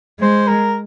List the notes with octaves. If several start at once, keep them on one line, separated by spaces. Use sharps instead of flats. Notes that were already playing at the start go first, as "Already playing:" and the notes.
G#3 C5
A#4